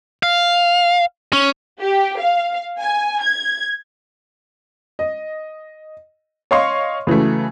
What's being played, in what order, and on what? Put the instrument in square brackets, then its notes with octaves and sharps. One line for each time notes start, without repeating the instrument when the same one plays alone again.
[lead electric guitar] F5
C#4
[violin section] G4
F5
G#5
G#6
[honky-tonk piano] D#5
C#5 D#5 F5 C6 C#6
C#3 E3 F#3 A3